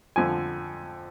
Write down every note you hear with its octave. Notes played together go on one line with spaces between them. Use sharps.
F2 D3 F3 G#5